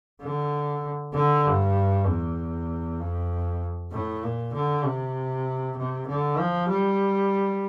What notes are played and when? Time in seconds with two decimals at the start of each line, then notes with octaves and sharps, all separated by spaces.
0.22 D3
1.14 D3
1.46 G2
2.07 E2
2.99 F2
3.91 A2
4.23 A#2
4.53 D3
4.84 C3
5.77 C3
6.08 D3
6.38 F3
6.69 G3